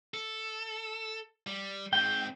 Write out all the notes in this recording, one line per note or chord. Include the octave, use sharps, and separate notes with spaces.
A4
G3
G#2 C4 G5